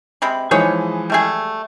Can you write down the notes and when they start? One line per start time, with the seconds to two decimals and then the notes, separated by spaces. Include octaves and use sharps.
0.22 C3 G#3 B5
0.51 E3 F3 G#3 D#4 G#4 C#5
1.10 G3 A3 G#4